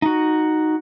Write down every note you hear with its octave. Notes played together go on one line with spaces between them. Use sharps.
D#4 F#4